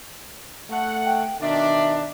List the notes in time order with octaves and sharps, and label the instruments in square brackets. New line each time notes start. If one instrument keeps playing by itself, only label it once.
[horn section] A3 F#5
[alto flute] G5
[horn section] B2 D#3 D4 [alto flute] E5